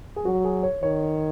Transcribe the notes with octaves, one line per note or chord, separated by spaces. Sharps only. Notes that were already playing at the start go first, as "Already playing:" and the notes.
G#4
F#3 F#4
G#4
C#5
D#3 C#5